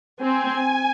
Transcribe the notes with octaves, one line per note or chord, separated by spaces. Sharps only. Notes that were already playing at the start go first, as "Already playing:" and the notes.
C4 G#5